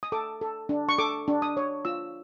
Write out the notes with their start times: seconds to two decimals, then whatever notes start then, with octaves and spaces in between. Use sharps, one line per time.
0.03 D#6
0.12 A4 D6
0.41 A4
0.69 D4
0.89 C#6
0.98 A4 D6
1.28 D4
1.42 D#6
1.57 C#5
1.85 F4 E6